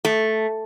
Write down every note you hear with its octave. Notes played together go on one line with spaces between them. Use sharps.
A3